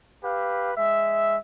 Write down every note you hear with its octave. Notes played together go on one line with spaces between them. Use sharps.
G4 B4 F5
G#3 E5